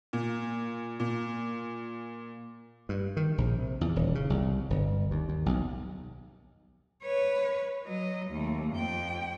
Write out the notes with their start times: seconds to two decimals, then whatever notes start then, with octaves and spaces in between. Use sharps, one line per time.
0.13 A#2
1.00 A#2
2.89 G2
3.17 D#3
3.38 A#1
3.58 C3
3.81 E2
3.96 D#1
4.15 C#3
4.30 C2
4.70 G1
5.11 D#2
5.29 D#2
5.46 B1
7.03 B4 C#5
7.86 F#3 D#5
8.30 D#2 A3
8.73 F2 G5